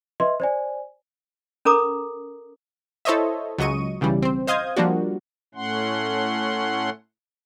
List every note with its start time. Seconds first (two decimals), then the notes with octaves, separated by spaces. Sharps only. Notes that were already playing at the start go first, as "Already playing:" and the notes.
0.20 B4 D#5 E5 C6
0.40 C5 D5 G#5
1.65 C#4 A4 A#4 A#5 D6 D#6
3.05 E4 A4 C5 C#5 D#5 E5
3.58 C#2 F#3 D#5 C#6 D#7
4.01 B1 C#3 E3 G3
4.22 C4 C5
4.47 C5 D#5 F5 D#6 G6 G#6
4.77 F3 G3 A#3 D4 F#4
5.55 A2 A3 C#4 F#5 C6